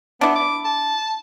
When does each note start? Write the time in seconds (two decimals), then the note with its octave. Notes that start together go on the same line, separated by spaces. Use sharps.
0.21 B3 D4 E4
0.36 D6
0.65 A5